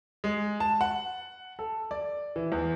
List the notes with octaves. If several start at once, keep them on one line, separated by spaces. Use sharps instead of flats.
G#3
A5
F#5
A4
D5
E3
E2